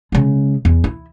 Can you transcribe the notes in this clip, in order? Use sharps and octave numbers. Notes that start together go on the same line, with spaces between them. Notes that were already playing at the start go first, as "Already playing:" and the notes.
C#3 G#3
E2
E4